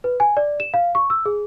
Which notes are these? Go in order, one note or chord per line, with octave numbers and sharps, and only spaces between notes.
B4
G#5
D5
E7
F5
C#6
E6
G#4